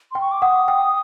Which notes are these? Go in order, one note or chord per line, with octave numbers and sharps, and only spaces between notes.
G5 C6
C#6
D6
F#5 D#6
G5